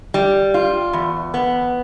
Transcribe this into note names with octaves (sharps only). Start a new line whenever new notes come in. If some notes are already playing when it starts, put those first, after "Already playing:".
G3
F4
E2
B3